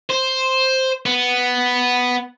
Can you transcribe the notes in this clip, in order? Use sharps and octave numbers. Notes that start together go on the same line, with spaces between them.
C5
B3